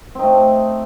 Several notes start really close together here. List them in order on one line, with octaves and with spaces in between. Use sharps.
C4 D#4 A3